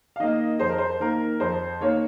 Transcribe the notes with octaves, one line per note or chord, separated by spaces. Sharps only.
F5
D#3 A#3 D#5
F2 C5
A#4
C5
D#3 A#3 A#4
F2 C5
D#3 A#3 C#5